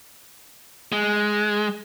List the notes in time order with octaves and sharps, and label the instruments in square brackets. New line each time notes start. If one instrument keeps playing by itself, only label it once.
[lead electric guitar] G#3